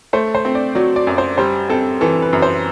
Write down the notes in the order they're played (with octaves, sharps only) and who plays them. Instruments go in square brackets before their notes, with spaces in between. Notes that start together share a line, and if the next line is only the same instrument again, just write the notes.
[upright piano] A3 [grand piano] C5
[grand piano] C5
[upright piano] C4
[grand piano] D5
[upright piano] F#3 [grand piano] D5
[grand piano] D5
[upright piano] F#2
[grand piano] C5
[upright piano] G3 [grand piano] C5
[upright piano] C4 [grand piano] A4
[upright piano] E3 [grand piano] A4
[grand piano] B4
[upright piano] F#2
[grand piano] C5